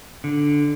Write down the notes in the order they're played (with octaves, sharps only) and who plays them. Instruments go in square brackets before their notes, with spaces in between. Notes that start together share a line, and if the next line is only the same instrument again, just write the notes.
[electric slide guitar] D3